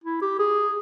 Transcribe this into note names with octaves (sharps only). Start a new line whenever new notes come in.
E4
G4
G#4